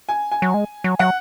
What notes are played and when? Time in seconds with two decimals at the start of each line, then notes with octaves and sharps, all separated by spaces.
0.09 G#5
0.31 G#5
0.42 F#3
0.54 G#3
0.84 F#3
0.99 F#3 F#5